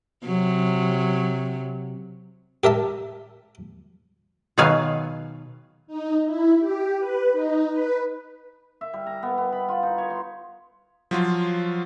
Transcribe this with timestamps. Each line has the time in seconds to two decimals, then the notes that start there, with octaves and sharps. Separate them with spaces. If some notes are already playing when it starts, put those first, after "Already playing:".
0.25 C3 F#3
2.64 G4 A#4 E5 A5
4.58 B2 D#3 F#3 G#4 B4 F5
5.87 D#4
6.25 E4
6.59 G4
6.99 B4
7.32 D#4
7.70 B4
8.81 E5
8.93 G3
9.07 A#5
9.23 B3
9.38 B3
9.52 B5
9.68 F4
9.83 D#4
9.98 C#5
10.10 C6
11.11 F3 F#3 F4